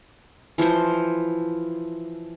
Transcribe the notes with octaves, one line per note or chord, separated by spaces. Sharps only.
E3 F3 C5 C6